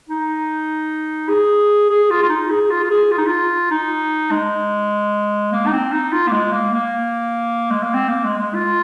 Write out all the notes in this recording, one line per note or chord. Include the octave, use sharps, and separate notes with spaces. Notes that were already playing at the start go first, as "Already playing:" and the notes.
D#4
G#4
G#4
F4
F4
D#4
G#4
F4
F4
G#4
F4
D#4
F4
D#4
G#3
A#3
D#4
C4
D#4
F4
A#3
G#3
A#3
A#3
G#3
A#3
C4
A#3
G#3
G#3
F4